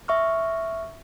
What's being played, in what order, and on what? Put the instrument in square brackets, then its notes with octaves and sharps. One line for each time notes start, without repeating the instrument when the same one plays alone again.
[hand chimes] E5 C#6 F6